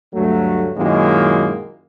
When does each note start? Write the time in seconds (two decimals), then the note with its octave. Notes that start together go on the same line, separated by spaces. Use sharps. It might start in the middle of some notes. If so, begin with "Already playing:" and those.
0.14 D2 G2 F#3 A3
0.77 F#2 A#2 D#3 G#3 A#3 E4